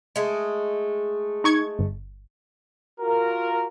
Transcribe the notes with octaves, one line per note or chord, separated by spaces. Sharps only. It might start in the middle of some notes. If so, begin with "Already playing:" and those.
G#3 A3
D#4 C#6 G#6
G1
F4 F#4 A#4